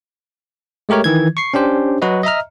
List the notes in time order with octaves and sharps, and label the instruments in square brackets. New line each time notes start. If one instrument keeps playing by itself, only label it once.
[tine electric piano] G#3 A3 G4 A#4 C#5
D#3 E3 G#6
C#6 C7
C#4 D4 G4 C5
F#3 F#4 B4 D#5
D#5 E5 A#5 F6